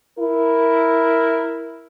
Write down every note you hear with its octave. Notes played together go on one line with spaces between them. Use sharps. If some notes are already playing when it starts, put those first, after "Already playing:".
E4 A#4